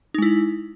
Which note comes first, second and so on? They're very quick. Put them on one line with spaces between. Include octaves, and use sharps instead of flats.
D#4 G#3 E4